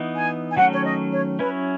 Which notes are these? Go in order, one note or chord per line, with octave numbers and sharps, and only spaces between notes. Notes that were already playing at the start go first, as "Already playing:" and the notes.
Already playing: E3 B3 D#4
G#5
G#5
D#3 F#3 A3 C#4 F#5
C#5
D#5
C#5
F#3 C#4 E4 B4